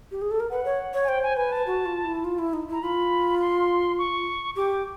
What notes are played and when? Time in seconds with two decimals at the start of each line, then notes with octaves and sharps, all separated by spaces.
0.11 G4
0.22 G#4
0.31 A4
0.40 A#4
0.50 B4 F#5
0.65 C#5
0.93 C#5
1.04 G#5
1.08 C5 G5
1.23 G#5
1.37 B4 G#5
1.52 A5
1.67 F#4
1.86 F4
2.04 E4
2.24 F4
2.38 E4
2.53 D#4
2.68 E4 A#5
2.82 F4 B5
3.40 C6
3.98 C#6
4.56 G4 D6